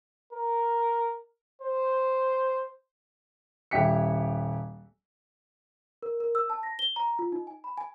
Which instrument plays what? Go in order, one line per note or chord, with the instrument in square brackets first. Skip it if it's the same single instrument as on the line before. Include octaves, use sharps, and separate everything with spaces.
[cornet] A#4
C5
[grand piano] D#1 E4 G4 B6 C#7
[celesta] A#4
A#4
E6
A5
A#6
G7
A#5
F4
D#4
G#5
B5
G#5